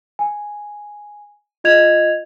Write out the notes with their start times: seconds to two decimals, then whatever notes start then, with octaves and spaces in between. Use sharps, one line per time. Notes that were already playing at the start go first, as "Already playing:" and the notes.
0.19 G#5
1.64 F4 D#5 G#6 F7